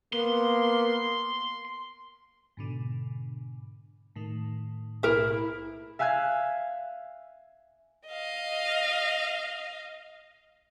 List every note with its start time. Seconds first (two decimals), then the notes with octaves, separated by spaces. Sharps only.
0.13 A#3 B3 C6
2.57 G#2 B2 D3
4.16 A2 D#3
5.03 B1 A2 E4 A#4 E5
5.99 E5 F5 G#5 F#6 G#6
8.08 D#5 F5